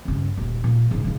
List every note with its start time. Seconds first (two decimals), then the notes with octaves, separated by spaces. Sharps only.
0.05 G2 C#3
0.37 D#1 D2
0.64 A#2
0.91 G#2 C#3
1.04 C#3 D#4